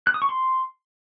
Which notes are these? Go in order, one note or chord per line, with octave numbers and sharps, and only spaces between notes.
F#6
D#6
C#6
C6